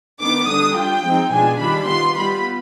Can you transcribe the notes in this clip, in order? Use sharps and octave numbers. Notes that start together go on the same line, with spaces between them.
D#3 B3 D4 D6
D3 G3 D4 D#6
G3 D4 F4 G5
F3 G#3 C4 D#4
B2 G#3 D4 F4 G#5
D#3 G3 D4 F4 B5
D#3 B3 F4 C6
G3 B3 F4 B5